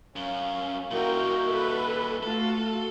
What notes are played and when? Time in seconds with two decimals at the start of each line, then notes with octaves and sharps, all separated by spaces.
0.16 F#2 C#4 F5
0.91 A#2 A#3 D#4 E4 F#4 A#4 G5
1.46 A4 B4 E5
2.23 A3 F4 F#4 A4 A5